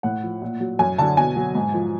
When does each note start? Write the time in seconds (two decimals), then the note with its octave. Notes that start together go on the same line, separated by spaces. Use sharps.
0.03 A2 F#5
0.23 F3
0.42 A#2
0.60 F#3
0.79 F#2 G#5
0.98 D3 F#3 A5
1.17 B2 G#5
1.36 F#3
1.55 G#2
1.74 F3